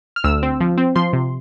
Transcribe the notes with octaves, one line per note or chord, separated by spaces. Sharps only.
F6
D2 E6
C4
F3
C4
F3 C6
C3